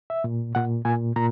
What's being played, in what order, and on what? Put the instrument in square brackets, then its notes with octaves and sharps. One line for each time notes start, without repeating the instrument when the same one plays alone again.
[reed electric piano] E5
A#2
A#2 F#5
A#2 G#5
A#2 A#5